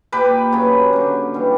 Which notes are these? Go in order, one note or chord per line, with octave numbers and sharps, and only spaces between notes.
A#2 A#3 G4 B4
C#3 F#3 B3
D3 A#3
C#3 E3 G3 B3